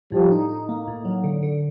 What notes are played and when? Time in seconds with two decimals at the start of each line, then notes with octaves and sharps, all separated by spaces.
0.12 A2 F3 G3
0.32 D#4
0.49 D#4
0.69 A#3
0.87 A2
1.05 F#3
1.24 D3
1.43 D3